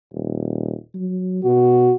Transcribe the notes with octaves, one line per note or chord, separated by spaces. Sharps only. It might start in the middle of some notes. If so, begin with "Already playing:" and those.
D#1
F#3
B2 F#4